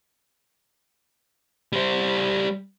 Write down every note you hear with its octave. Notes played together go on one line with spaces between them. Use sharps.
G3 C5